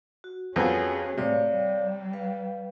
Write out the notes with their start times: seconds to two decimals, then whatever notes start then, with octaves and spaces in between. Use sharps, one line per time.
0.24 F#4
0.56 F2 B3 C#4 G#4 G#5
1.18 A2 C3 C#5 D5 F5
1.56 G3
2.13 B4 F5